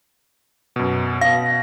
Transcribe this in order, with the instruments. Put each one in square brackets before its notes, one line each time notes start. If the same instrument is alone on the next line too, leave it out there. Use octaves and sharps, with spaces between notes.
[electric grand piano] F#2 B2
[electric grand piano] B2 A#6 [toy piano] F5